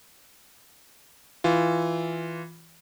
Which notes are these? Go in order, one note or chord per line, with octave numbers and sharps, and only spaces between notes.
E3 F4